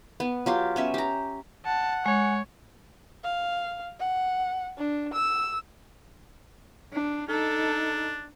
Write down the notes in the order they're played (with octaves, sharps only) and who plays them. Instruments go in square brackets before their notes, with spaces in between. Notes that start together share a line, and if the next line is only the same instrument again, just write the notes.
[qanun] B3
F#3 F4 G4
B3 C#4 E5
G4 A#5
[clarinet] F#5 [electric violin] A5
[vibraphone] G#3 [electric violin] C#5
[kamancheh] F5
F#5
D4
E6
[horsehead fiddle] D4
[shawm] D4 [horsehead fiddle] D#4 A4